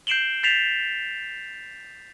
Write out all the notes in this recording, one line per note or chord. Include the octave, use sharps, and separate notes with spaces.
G6 C7 D7 E7 F#7 G7
G6 A6 B6 C7 E7 F7